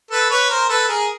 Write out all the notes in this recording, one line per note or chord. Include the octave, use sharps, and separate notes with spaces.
A4 B4
B4 C#5
A#4 C5
A4 B4
G#4 A#4